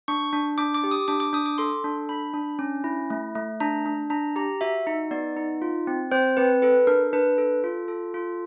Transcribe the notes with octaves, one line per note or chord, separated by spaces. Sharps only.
D4 C#6
D4
D4 D6
D6
G4
D#6
D4 D6
D6
D4 D#6
D6
A4 C6
D4
D4 B5
D4
C#4
E4
A3
A3
D4 A#5
D4
D4 A#5
G4 A#5
F#4 E5
D#4
B3 D5
D#4
F4
C4
C4 C5
C4 B4
A4 B4
D4 A#4
D4 B4
A4
F4
A4
F4